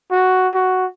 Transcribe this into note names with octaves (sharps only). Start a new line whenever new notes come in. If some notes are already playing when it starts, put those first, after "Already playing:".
F#4
F#4